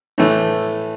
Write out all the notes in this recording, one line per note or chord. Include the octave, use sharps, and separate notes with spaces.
A2 E3 A3